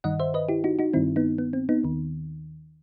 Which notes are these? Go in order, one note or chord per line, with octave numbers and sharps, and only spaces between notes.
G2 D#3 D#5 F#5
C5 E5
B4 D#5
E4 G4
D#4 F#4
D#4 F#4
G2 D#3 C4 E4
B3 D#4
B3
C4
B3 D#4
D#2 D#3